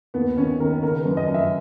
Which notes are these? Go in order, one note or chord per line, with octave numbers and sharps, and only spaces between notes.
D#2 B3
D#3 C#4
D#3 A#4
C#3 A#4
F#2 B4
D#5
F#2
E5